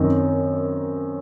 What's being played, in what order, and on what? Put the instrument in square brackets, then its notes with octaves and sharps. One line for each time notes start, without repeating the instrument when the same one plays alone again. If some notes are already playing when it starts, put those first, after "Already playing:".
Already playing: [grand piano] F#2 D#3 C4 D#4